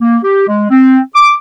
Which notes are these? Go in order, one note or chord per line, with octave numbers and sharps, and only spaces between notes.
A#3
G4
G#3
C4
D6